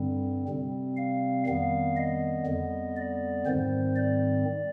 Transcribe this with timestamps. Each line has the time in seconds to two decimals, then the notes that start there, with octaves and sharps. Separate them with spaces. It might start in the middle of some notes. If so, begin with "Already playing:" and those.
Already playing: G2 D3 G3 C4
0.48 C3 G3 C4
0.97 F5
1.47 F2 D#3 G3 B3 F5
1.96 D#5
2.46 F2 D3 G3 B3
2.96 D5
3.46 G#2 D#3 G3 C4 C5
3.96 D5